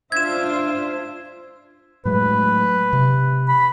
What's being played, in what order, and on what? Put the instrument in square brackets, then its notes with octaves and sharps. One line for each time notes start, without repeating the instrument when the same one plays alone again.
[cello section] D4 F4 C5 [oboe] E5 [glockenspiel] G#6 E7
[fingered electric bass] A2 F#3 G#3 [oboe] B4
[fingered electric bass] C3
[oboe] B5